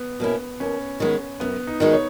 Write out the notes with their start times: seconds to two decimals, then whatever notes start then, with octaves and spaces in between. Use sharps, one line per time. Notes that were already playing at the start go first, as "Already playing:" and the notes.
Already playing: B3
0.20 B2 A#3 C#4 E4
0.60 D#2 C#4
1.00 D#3 G#3 B3
1.40 F#2 B3
1.67 D#4
1.80 D#3 G#3 D#4 F#4
1.93 C#5